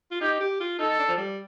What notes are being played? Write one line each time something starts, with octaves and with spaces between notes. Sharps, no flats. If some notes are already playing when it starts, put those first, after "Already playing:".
F4
D#4 G4
G4
F4
D#4 A4
D4
F3
G3